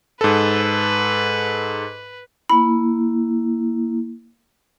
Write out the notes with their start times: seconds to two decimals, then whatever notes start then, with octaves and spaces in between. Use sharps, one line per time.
0.21 G#2 A4 B4
2.49 A#3 E4 B5